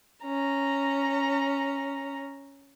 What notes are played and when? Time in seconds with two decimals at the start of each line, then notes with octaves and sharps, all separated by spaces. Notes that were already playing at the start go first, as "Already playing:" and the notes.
0.25 C#4 A#5